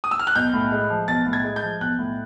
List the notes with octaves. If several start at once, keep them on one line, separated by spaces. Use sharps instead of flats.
D#6
E6
F6
F#6
B1 G6
A2
G#3
F3
B1 A6
A2
G#6
G#3
G6
F3
B1 F#6
A2